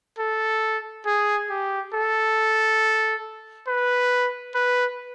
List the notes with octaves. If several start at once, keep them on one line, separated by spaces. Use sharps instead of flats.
A4
G#4
G4
A4
B4
B4